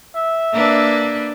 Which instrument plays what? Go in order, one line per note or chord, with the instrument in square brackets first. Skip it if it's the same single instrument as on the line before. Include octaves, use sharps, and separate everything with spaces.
[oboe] E5
[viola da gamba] A#3 D4 B4